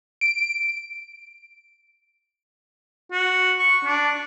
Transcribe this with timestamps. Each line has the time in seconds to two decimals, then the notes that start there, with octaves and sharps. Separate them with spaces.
0.21 D7
3.12 F#4
3.59 C#6
3.85 D4